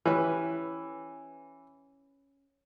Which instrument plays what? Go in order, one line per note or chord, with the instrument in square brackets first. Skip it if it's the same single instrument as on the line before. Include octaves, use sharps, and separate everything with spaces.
[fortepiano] E3 [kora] C#4 G4 B4